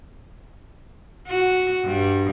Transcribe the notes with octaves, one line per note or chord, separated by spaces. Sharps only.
F#4
G2